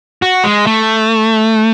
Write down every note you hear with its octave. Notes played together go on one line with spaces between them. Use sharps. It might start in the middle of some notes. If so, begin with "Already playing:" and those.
F#4
G#3
A3